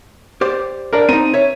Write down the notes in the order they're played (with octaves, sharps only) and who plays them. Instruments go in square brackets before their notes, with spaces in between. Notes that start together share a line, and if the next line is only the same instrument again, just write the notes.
[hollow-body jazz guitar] G4 C5 D5
[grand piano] D4 A#4
[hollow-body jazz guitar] C4 D#4 [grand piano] A#5 D#7
[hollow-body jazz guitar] C#5 E5